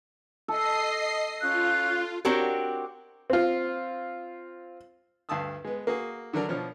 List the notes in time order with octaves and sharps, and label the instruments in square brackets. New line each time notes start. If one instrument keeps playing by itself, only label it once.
[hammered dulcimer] A4 [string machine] D#5 C7
[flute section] C#4 F5 F#6 [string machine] F4
[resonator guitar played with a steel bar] C4 D4 F#4 G4 A#4 C#5
[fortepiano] C4 F4
D2 G2 F5 A5 D#6 E6
G#3 B3
A#3 F#4 G#4
D3 F#3 D4 A#4
B2 F3 D4 C#5 F6